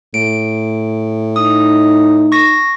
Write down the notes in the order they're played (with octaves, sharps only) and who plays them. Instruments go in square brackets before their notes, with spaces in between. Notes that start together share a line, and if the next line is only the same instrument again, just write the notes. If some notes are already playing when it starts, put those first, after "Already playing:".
[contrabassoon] A2 [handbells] D7
[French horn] D#4 [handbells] D#6
[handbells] C#6 A#6